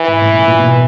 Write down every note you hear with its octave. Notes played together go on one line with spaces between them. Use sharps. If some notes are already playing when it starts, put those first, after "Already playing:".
Already playing: E3
G#2
A2
A#2
A#2
B2